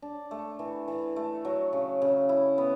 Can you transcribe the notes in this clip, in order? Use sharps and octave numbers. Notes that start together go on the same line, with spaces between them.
D4
A3
E3
E3
A3
F#3
C#3
C#3
E4
B3